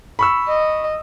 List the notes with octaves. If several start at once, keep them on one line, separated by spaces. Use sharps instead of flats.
B5 C#6 E6
D#5